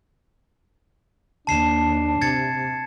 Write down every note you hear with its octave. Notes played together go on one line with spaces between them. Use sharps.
D#2 D4 A5 C7 E7
C3 G#6 A6 C#7